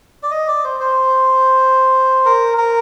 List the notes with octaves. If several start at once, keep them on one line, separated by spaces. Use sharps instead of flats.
D5
D#5
D5
C5
C5
A#4
A#4